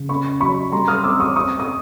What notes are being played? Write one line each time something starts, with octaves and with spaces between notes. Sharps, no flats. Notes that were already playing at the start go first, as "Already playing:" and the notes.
Already playing: C#3
C#4 B5 C#6
F#3 B5 C#6
G3 A#5 C6
D#6 F6
C4 D6 E6
C#6 D#6
C4 C#6 D#6
D#6